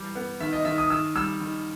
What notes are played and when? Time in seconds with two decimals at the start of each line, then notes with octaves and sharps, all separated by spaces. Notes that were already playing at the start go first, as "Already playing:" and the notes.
Already playing: E3 G3
0.15 B3
0.40 D#3 E5
0.53 D#5
0.65 D#3 E5
0.78 D#6
0.90 D#3 E6
1.15 G3 E6
1.40 D#3